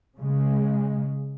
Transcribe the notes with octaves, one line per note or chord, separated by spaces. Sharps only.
C#3 G#3